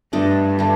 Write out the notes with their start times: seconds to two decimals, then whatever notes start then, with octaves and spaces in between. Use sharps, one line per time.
0.13 G2 A3 D4 A4 D#5
0.59 A3 D4